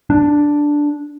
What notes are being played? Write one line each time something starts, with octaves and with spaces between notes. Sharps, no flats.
D4